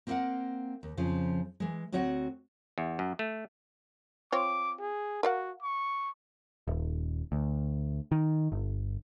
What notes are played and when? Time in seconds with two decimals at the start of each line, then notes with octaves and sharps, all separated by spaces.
0.07 A#3 C4 A4 A#4 F5 F#5
0.83 D#2
0.97 F2 C#3 F3
1.60 E3 G#3
1.92 D2 C4 F#4 C#5 D#5 F#5
2.78 E2
2.99 F#2
3.19 A3
4.32 C4 F4 C#5 D6
4.80 G#4
5.23 F#4 A#4 F5 F#5
5.62 C#6
6.68 D#1
7.32 D2
8.12 D#3
8.52 G1